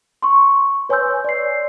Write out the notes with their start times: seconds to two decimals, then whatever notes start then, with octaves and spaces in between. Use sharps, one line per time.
0.22 C6 C#6
0.89 B4 C#5 G#5 C6 E6 G6
1.24 D5 C7